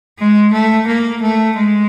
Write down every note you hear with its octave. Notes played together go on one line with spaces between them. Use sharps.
G#3
A3
A#3
A3
G#3